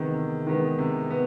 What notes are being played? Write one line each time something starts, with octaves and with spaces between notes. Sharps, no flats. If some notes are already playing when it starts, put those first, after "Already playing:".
Already playing: C3 D#3 G#3 B3
C3
D#3 G#3 B3
C3
B3